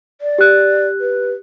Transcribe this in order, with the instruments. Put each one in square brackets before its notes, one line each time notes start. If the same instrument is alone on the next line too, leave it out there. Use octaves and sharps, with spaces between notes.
[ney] D5
[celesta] G4 F#6
[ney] B4